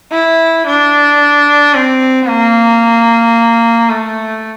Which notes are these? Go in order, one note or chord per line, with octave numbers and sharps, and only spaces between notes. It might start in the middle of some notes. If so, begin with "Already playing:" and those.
E4
D4
C4
A#3
A3